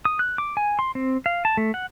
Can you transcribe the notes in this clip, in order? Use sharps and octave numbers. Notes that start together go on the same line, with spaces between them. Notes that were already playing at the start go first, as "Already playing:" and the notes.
D#6
F#6
D6
G#5
C6
C4
F5
A5
A3
F#5